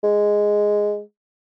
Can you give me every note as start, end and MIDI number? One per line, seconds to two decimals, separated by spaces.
0.04 1.00 56